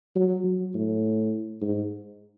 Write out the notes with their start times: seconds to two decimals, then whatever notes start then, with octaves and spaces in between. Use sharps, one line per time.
0.16 F#3
0.44 F#3
0.75 A2
1.62 G#2